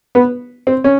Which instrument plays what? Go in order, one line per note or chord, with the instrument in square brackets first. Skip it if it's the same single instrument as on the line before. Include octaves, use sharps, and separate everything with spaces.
[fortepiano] B3
C4
C#4